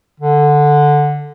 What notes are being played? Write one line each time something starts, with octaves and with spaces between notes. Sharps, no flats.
D3